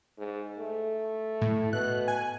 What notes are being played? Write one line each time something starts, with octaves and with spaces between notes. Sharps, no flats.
G#2
A3
A2
B2 F#6
G#5